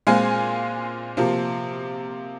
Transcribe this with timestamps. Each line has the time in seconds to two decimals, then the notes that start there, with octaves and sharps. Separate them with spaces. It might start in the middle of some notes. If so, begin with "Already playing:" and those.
0.07 A#2 G#3 C4 F5 G#5
1.17 C3 F3 A#3